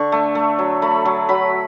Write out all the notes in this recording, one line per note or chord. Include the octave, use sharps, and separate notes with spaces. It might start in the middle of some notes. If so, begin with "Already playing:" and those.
Already playing: D3 C#6
A3
A3
F#3
A3 B5
F#3
F#3 B5